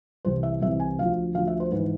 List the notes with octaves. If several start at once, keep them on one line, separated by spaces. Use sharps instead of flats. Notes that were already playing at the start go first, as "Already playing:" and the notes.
C2 C3 E3 C5
E5
C2 C3 E3 E5
G#5
D2 D3 F3 F5
D2 D3 F3 F5
E5
C5
G#2 E3 B4